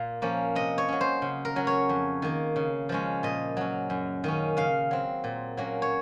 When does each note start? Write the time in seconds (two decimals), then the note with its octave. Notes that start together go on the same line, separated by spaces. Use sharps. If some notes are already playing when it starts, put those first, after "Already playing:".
Already playing: A#2 F5
0.22 F3 A#3 C#4
0.55 C3 D#5
0.78 C#5
0.88 F#3 C#4
1.01 C5
1.22 C#3
1.45 A#4
1.56 F#3 C#4
1.67 C#5
1.89 F2
2.22 D#3 A#3
2.56 C#3
2.89 F3 G#3 C#4
3.23 A#2 D#5
3.57 F#3 C#4
3.90 F#2
4.24 D#3 A#3 C#4
4.57 C#3 F5
4.91 F#3 C4
5.24 A#2
5.57 F#3 A#3 C#4
5.82 C#5